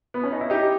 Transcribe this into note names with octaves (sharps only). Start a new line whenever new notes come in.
B3
C#4
D#4
E4
D#4 G4